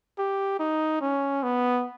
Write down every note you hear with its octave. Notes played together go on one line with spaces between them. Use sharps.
G4
D#4
C#4
B3